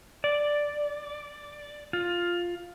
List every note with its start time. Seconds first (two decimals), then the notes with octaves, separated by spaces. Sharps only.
0.24 D5
1.93 F4